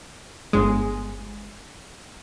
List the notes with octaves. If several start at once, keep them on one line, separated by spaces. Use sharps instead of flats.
G1 G#3